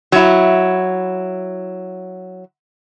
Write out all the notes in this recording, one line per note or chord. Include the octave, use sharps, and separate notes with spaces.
F#3 E4